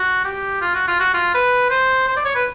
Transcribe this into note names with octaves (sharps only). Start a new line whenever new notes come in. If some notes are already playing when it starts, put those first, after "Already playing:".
Already playing: F#4
G4
F4
F#4
F4
F#4
F4
B4
C5
C5
D5
C#5
B4